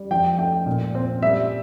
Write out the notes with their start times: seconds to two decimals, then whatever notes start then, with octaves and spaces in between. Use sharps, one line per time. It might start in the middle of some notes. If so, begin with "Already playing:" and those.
Already playing: G3
0.11 F3 G5
0.38 A3 G5
0.66 A#2
0.95 C4
1.22 G3 E5